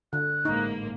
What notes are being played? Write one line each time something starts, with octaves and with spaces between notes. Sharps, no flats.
D3 F#6
A1 G#2 A#3 D#4